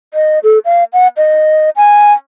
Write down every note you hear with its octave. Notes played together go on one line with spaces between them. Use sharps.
D#5
A4
F5
F#5
D#5
G#5